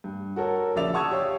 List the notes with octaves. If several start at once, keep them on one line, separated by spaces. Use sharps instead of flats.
G2
F#4 A4 A#4 C#5
A#1 C#3 D5 E5 A6 F7
F#5 A5 C#6 D#6 E6 G#6
G4 C#5 F5